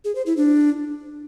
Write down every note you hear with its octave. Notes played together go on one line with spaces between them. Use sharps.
G#4
C5
E4
D4